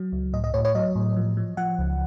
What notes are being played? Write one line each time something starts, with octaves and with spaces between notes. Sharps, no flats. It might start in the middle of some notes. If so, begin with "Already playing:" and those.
Already playing: F#3
C#2
A2 D#5
D#5
A2 C#5
C#5
F#3 D#5
A2
F3
F3
F3 F#5
C#2